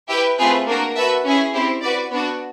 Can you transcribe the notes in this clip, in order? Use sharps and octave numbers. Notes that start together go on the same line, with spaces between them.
E4 G4 B4 E5 G5
A3 C4 F4 G#4 B4
A#3 D4 F#4 A#4
F#4 B4 E5 A5
C#4 E4 G#4
C4 E4 G4
F#4 B4 D5
B3 D4 F#4